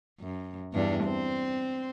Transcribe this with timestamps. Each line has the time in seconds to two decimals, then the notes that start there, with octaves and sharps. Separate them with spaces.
0.21 F#2
0.73 E2 G2 D4
1.04 C4 C5